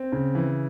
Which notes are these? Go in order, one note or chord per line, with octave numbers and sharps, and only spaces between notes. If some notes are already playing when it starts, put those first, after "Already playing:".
Already playing: C4
C#3
E3